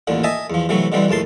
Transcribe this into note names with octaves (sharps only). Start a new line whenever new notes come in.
A1 D#2 A#2 D3
D#5 E5 G#5 A5
E2 F3
C3 E3 F#3 A3
B2 D3 E3 G3 C4
A#1 D#2 A2 A5 C6